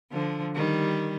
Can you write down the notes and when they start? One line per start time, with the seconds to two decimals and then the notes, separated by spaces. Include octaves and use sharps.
0.12 D3 F3
0.55 D#3 G3